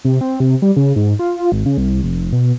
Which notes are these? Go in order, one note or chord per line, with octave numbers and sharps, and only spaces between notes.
C3
C4
C3
G3
C#3
G#2
F4
G#1
C#3
C2
F1
B2